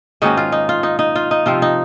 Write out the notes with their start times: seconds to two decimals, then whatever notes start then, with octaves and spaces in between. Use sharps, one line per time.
0.22 G#2 D#3 A#3 C#4 D#4 F#4
0.37 F4
0.52 D#4
0.69 F4
0.83 D#4
0.99 D#4
1.16 F4
1.31 D#4
1.46 C3 F3 C4 F4
1.62 D#4